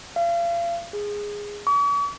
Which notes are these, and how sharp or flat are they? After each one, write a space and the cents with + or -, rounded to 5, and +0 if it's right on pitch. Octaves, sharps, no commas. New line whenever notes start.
F5 -35
G#4 -10
C#6 +45